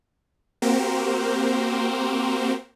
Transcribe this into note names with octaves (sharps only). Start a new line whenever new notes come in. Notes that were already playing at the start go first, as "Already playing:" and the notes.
A#3 C4 F#4 G4 A#4 C5